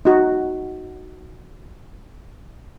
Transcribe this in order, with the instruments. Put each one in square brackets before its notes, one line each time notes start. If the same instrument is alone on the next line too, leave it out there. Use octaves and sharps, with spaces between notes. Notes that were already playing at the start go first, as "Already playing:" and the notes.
[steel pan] D#4 F#4